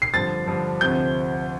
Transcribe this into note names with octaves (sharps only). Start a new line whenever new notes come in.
C7
G2 D3 F3 A6
G2 D3 F3
D2 C3 F3 G6